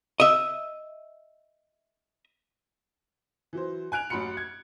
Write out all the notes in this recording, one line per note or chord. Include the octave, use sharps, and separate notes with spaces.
D#5 E5
E3 F#3 C5
G#5 F#6 D7 F7
A1 F#2 F#4 B5 C6 C#7
G#6